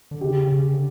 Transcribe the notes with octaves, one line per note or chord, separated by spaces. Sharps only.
D3
C#3 G4
C#3
D3